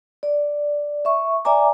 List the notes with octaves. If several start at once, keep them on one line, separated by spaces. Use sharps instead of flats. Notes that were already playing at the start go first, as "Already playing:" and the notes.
D5
E5 C#6
D5 E5 G#5 A#5 D6